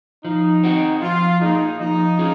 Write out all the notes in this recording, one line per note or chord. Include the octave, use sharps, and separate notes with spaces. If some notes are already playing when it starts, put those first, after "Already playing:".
F3 D#4
C4 F#4
F3 F4
A#3 D#4 F4 G#4
F3 D#4
C#4 F4 G#4